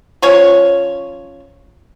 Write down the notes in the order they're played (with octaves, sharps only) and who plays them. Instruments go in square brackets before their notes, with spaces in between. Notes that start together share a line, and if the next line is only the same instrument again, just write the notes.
[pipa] F3 C#4 C#5